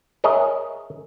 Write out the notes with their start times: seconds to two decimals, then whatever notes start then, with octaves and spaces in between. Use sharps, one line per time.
0.24 G#4 A#4 C#5 D#5 E5